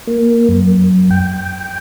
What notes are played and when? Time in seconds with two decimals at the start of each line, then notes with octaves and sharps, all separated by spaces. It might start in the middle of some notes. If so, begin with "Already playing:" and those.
0.07 A#3
0.49 F#2
1.11 G5
1.33 G5